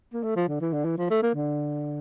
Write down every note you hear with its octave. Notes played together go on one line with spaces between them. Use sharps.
A#3
A3
F3
D3
E3
D3
E3
F3
A3
A#3
D3